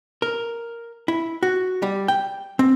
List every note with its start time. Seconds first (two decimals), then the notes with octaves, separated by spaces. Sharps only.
0.22 A#4
1.08 E4
1.43 F#4
1.82 G3
2.08 G5
2.59 C4